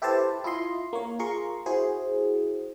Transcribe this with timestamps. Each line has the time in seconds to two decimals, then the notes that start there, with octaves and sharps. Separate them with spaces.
0.02 E4 G4 A4 B4 C5 A5
0.44 E4 F4 D#5 C6
0.93 A#3 C#5
1.19 F4 G#4 A#4 C6 C#6
1.66 E4 F#4 G#4 C5